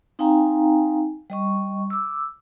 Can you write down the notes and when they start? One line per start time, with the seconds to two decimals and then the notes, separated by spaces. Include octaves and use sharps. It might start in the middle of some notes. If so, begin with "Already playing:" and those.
0.19 C4 D#4 F5 G5 G#5 A#5
1.30 G3 D#5 C#6
1.90 D6 E6